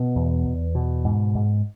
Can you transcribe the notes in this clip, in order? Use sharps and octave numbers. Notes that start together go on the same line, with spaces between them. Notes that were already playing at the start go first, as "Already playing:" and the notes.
Already playing: B2 B3
E2
E2
B2
G#2
G#2